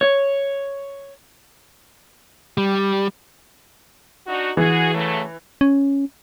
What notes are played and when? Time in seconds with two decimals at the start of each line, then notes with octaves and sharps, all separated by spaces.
0.01 C#5
2.58 G3
4.27 D4 D#4 F#4
4.57 E3 F#4 G#4
4.94 C#3 F#3 A3
5.61 C#4